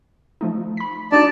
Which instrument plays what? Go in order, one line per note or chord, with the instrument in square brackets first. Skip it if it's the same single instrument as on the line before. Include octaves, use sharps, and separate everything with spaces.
[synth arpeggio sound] F3 A3 D#4
B5 B6
[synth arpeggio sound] D4 D#4 F#4 [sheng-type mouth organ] D5 A5